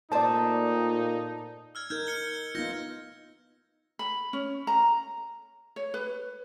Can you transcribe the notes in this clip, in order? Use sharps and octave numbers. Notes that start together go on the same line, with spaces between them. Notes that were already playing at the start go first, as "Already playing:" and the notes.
A#2 A3 C4 D#4 C5 D5 A5
E6 F6 G#6
D#4 A#4 F6 G6 G#6
F6 C#7 G7
B3 D#4 F4 G6 A#6
B5
C#4
A#5
C#5
B4